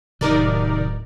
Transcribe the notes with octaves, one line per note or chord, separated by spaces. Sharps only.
D1 C3 D#3 D#4 A#4 D5